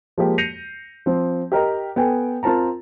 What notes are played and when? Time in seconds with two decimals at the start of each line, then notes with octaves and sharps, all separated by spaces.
0.18 F3 G#3 A#3 G4
0.38 G6 A#6 C7 C#7 D#7 F7
1.06 F3 C4
1.52 G4 A#4 D#5 A#5
1.96 B3 A4 G5 G#5
2.43 C4 F4 A#4 A5 A#5